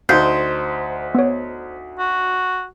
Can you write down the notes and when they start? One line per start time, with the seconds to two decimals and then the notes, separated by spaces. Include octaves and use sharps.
0.09 D2 D#4 C5 F5 G6 C7
1.15 B3 C#5
1.99 F#4